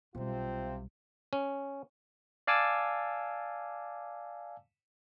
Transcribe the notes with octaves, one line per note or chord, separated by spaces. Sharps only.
B1 C3 G3 C4 F4
C#4
D5 F5 G#5 A5 D6 E6